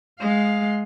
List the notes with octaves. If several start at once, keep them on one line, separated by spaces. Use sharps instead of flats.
G#3 F5